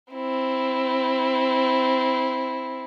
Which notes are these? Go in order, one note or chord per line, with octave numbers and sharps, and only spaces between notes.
C4 E4